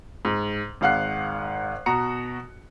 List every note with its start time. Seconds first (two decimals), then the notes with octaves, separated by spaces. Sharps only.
0.25 G#2
0.81 G#1 G#2 F5 F#5 F#6 C7
1.86 B2 F#4 A#5 C#7